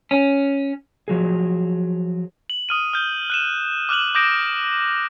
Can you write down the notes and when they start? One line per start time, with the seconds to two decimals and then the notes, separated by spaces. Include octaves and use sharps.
0.11 C#4
1.08 F3 F#3 G#4
2.50 F#7
2.69 D#6 F6 D#7
2.94 F6 G6 G7
3.30 F#6 D#7 E7
3.89 D6 F6 F#6 F7 F#7
4.15 D6 D#6 G6 A#6 D7